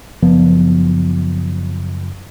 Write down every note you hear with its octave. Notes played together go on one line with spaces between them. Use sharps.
F#1 F3 B3